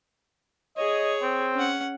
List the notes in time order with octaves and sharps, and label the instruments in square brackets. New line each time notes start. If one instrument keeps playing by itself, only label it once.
[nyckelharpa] G#4 C#5 [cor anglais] D#5
[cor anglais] C4
[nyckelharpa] C#4 F#5